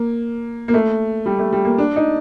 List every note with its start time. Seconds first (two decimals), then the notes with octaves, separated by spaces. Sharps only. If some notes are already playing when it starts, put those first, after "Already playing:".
Already playing: A#3
0.68 A#3
0.74 A3
1.26 G3
1.39 A3
1.52 G3
1.65 A#3
1.78 D4
1.96 D#4